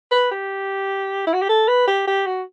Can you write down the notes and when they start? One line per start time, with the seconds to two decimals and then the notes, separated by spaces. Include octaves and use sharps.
0.11 B4
0.31 G4
1.27 E4
1.33 F#4
1.42 G4
1.49 A4
1.68 B4
1.88 G4
2.07 G4
2.27 F#4